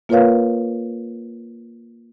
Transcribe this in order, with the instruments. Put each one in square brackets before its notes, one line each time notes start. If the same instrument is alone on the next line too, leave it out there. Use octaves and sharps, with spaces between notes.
[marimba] A#3 F4 A#4 B4 C#5 F5